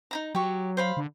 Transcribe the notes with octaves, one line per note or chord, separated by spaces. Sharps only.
D#4 E4 A#5
F#3 G4 C#6
C5 F5 B5
D3